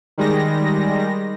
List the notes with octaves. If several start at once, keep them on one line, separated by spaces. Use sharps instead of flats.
D#3 G3 G#3 A#6